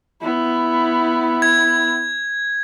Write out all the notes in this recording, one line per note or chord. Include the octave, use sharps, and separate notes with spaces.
B3 E4
G#6